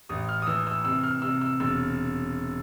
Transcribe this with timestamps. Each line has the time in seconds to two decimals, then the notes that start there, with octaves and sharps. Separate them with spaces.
0.09 A1 D#6
0.29 F6
0.42 D#6
0.47 E3 E6
0.67 E6
0.85 C3 E6
1.03 F6
1.22 C3 E6
1.41 E6
1.60 E1 E6